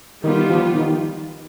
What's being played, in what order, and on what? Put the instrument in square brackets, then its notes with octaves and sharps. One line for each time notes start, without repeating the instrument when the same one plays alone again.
[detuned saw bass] D#3 [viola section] G3 B3 F4
[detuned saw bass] F3
D#3